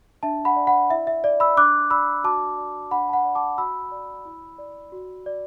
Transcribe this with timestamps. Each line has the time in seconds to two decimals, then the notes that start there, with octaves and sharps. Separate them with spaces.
0.23 D4 E5 A5
0.45 F#5 B5
0.56 D5
0.67 F#5 B5
0.90 E4 E5
1.07 E5
1.24 D5
1.40 B5 E6
1.57 D4 D6 F#6
1.90 D5 B5 E6
2.24 F#4 A5 D6
2.58 D5
2.91 D4 F#5 B5
3.09 A5
3.13 F#5 B5
3.24 D5
3.35 A5 D6
3.58 F#4 B5 E6
3.92 D5
4.25 E4
4.58 D5
4.92 F#4
5.26 D5